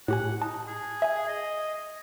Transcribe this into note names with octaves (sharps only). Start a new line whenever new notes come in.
A2 G4 F#5 G#5
D#4 A5
G#4
E5 G#5
D#5